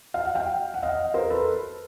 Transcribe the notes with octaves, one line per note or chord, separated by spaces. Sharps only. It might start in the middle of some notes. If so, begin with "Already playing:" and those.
F5
F#5
F5 G5
F#5
D#5 F5
A#4 C5
A4 B4